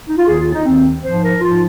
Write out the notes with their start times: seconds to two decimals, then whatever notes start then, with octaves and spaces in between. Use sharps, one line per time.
0.09 D#4
0.18 F4
0.27 D#2 D#3 G#4
0.40 F4
0.53 D#4
0.65 D#2 D#3 C4
1.03 G#2 F3 C5
1.22 A#4
1.40 G#2 F3 F4